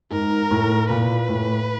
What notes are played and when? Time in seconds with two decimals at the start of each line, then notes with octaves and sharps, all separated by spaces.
0.11 G#2 A#4
0.51 A2
0.89 A#2 B4
1.29 A2